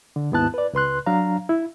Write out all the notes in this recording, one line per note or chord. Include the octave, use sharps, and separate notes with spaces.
D3
D#2 G#2 B3 E4 A5 F#6
B4 D5
C#2 B4 C6 F#6
F#3 D4 F5 A#5
E4